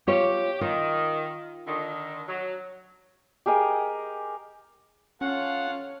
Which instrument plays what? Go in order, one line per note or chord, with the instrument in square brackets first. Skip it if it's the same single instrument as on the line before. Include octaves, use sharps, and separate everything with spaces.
[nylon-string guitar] F4 C#5 [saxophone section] G4
[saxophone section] D#3 [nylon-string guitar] F4
[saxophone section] D3 D#3
F#3
[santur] G4 G#4 A#4 D#5
[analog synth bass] C#4 [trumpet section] F4 A4 F5 [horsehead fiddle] C#5 [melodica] F#5